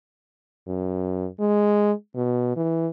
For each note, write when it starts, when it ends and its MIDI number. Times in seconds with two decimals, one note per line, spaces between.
0.67 1.27 42
1.40 1.92 56
2.16 2.52 47
2.56 2.88 52